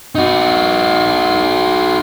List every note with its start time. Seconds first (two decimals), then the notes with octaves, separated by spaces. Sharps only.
0.15 D#4 F#4